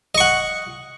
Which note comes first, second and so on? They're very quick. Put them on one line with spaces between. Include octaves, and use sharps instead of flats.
D#5 C#6 F#5